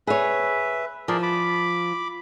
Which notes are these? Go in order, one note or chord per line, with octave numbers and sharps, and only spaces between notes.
G#4 B4 C#5 E5
F3 G#4 A#4 D5
B5 D6